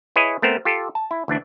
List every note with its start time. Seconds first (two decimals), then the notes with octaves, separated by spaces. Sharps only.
0.16 E4 G#4 B4 C#5 D#5
0.42 A3 B3 C4 A#4 C5
0.65 F4 G4 A4
0.95 A5
1.11 E4
1.28 D2 E3 D4